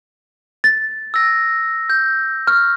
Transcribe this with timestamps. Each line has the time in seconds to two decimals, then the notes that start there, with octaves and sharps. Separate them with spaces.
0.64 A6
1.14 E6 A#6
1.90 G6
2.47 C#6 F6